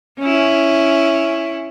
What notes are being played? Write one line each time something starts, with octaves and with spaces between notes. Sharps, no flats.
C#4 E4